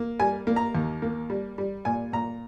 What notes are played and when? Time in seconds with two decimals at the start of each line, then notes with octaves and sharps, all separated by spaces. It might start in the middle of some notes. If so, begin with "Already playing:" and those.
Already playing: A#3
0.20 G3 G#5
0.47 A#3
0.56 A#5
0.75 D#2
1.02 A#3
1.30 G3
1.58 G3
1.85 A#2 G#5
2.13 A#2 A#5